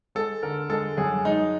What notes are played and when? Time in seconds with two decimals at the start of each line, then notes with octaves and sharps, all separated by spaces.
0.15 G#3 A4
0.43 D3 A#4
0.69 G#3 A4
0.97 F#2 G#4
1.25 G#3 D#4